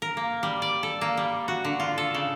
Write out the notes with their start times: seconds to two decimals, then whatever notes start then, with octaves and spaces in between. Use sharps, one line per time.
0.02 A#4
0.17 A#3
0.43 G3
0.62 D5
0.83 A4
1.01 A#3
1.17 G3
1.48 F#4
1.65 D3
1.80 F4
1.98 A4
2.14 C#3